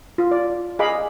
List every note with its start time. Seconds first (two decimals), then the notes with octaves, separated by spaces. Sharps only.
0.18 F4
0.31 D5
0.79 G#4 D#5 F5 B5 D6